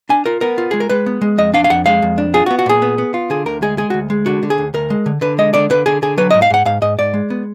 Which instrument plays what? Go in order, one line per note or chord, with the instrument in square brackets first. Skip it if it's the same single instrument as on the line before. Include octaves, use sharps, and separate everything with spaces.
[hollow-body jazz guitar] D4 G#5
F4 A#4
B3 A#4
F4
G#3 G#4
A#4
G#3 B4
B3
G#3
F2 D#5
D4 F5
F5
F2 F#5
G#3 F5
F2
D4
F4 G#4
F#4
B3
F#4
A#2 G#4
B3
B3
F4
D3 G#4
D2 A#4
G#3 G#4
G#3 G#4
F#4
D2
G#3
D3 F#4
D3
G#4
D2
D2 A#4
G#3
D3
D3 B4
G#3 D#5
D3 D5
D3 B4
D3 G#4
D3 G#4
F#3 B4
D#5
G#2
F5
G#2 F#5
G#2 F5
G#2 D#5
G#2 D5
G#3
B3